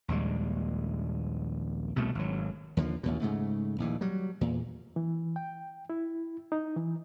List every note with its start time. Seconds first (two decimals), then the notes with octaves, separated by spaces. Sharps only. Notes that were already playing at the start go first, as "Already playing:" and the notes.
0.08 A#1 D#2 G3 G#3
1.96 C2 B2 A3
2.15 G#1 F#3
2.77 D#2 D3 F3
3.03 A1 D#2 B2
3.21 G#2 C#3 A3
3.78 A#1 D#2 E3
4.01 F#3 G3
4.41 E2 A#2
4.96 E3
5.36 G5
5.90 E4
6.52 D#4
6.76 E3